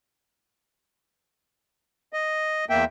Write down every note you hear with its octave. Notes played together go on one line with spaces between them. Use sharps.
D#5
E2 A#3 E5 G5